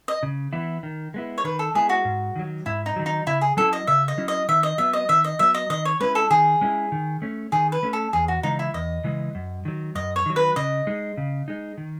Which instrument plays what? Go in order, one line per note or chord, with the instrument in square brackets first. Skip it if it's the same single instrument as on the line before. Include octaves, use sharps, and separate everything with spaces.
[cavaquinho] D#5
[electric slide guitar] C#3
E3 B3 E4
D#3
G#3 B3 E4
[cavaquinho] C#5
[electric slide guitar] D#3 [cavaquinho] B4
[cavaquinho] A4
[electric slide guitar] G#3 B3 E4 [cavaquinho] G#4
[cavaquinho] F#4
[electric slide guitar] G#2
D#3 F#3
[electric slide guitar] G#2 [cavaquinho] E4
[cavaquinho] D#4
[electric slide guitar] D#3 F#3
[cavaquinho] D#4
[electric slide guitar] C#3 [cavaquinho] E4
[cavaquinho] G#4
[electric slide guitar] F#3 C#4 E4 [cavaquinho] A4
[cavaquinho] D#5
[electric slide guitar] C#3 [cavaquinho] E5
[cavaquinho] D#5
[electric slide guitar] F#3 C#4 E4
[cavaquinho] D#5
[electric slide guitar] D#3 [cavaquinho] E5
[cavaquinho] D#5
[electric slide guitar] F#3 B3 [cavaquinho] E5
[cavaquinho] D#5
[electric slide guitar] D#3 [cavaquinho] E5
[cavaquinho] D#5
[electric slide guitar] F#3 B3 [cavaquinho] E5
[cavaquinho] D#5
[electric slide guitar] D#3 [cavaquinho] D#5
[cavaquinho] C#5
[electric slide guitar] G#3 C#4 E4 [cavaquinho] B4
[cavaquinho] A4
[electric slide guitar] D#3 [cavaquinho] G#4
[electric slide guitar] G#3 C#4 E4
D#3
A3 C#4
[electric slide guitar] D#3 [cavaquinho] G#4
[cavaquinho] B4
[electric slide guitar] A3 C#4
[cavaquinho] A4
[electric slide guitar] E2 [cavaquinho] G#4
[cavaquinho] F#4
[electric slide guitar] C#3 E3 G#3 [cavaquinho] D#4
[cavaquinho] E4
[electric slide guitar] E2 [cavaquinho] D#5
[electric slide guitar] C#3 E3 G#3
F#2
D#3 F#3
[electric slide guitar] F#2 [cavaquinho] D#5
[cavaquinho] C#5
[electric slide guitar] D#3 F#3
[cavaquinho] B4
[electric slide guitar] C#3 [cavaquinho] D#5
[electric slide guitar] G#3 D#4
C#3
G#3 D#4
D#3